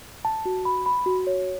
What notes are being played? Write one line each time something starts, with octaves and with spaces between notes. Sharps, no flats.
A5
F#4
B5
B5
F#4
C#5